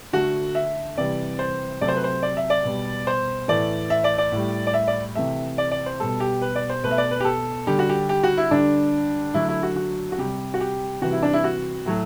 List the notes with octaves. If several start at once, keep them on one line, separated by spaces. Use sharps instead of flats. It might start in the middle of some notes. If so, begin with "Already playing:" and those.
D3 A3 F#4
E5
C3 E3 G3 D5
C5
C3 F#3 A3 D5
C5
B4
C5
D5
E5
D5
B2 G3
C5
A2 E3 A3 D5
E5
D5
D5
A2 G3
D5
E5
D5
C3 E3 A3 E5
D5
D5
C5
B2 G3 A4
G4
B4
D5
C5
B2 A3 B4
E5
D5
B4
G4
A4
D3 G3 G4
F#4
G4
G4
F#4
E4
D3 G3 D4
D3 F#3 A3 E4
E4
F#4
F#4
F#4
C3 G3 G4
F#4
G4
C3 E3 G3 F#4
E4
D4
E4
F#4
A2 F#3 A3